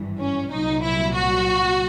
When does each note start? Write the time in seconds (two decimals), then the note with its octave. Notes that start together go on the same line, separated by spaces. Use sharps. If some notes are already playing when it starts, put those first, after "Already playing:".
Already playing: G#1 G2 E3
0.19 C#4
0.52 C2 A#2 F#3 D#4
0.83 E4
1.15 F#4